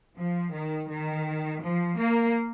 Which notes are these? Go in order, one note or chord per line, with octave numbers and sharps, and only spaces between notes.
F3
D#3
D#3
F3
A#3